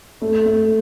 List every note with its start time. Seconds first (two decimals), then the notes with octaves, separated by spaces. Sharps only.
0.22 A3
0.46 A3